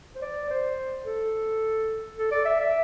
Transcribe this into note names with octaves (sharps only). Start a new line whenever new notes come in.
C5
D5
C5
A4
A4
D5
E5
E5